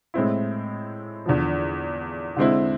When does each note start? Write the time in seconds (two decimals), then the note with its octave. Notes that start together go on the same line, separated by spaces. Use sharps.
0.14 A2 G#3 C4 E4
1.26 E2 D3 F3
2.37 D3 G#3 C4 E4